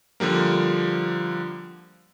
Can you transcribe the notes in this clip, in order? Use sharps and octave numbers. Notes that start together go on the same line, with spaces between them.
D3 F3 G3 A#3